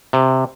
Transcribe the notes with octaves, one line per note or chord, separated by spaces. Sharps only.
C3